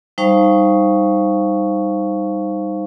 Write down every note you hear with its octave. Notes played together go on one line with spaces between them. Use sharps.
G3 D#4 C5 F5 A5 C#6